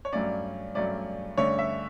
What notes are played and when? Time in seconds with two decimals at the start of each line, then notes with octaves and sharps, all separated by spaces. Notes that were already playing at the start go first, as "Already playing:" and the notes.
0.05 C#5
0.12 G2 F#3 A3 C#4 D5
0.75 G2 F#3 A3 C#4 D5
1.38 G2 D3 A3 C#4 C#5
1.59 E5